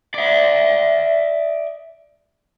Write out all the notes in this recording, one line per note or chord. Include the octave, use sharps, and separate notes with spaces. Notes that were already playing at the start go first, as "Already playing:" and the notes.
D5 E5